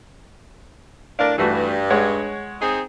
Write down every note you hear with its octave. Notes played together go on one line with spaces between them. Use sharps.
A2 D4 A#4 D5 F5
G2 E3 A3 F#4
G#3 C#5 F#5
C4 D#4 G#4